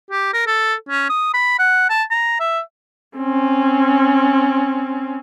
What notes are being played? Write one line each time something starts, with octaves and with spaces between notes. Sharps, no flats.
G4
A#4
A4
C#4
D#6
B5
F#5
A5
A#5
E5
C4 C#4